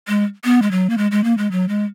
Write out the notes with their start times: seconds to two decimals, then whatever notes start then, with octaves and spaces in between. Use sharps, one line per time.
0.08 G#3
0.44 B3
0.62 G#3
0.71 F#3
0.90 A#3
0.98 G#3
1.11 G#3
1.24 A#3
1.38 G#3
1.51 F#3
1.69 G#3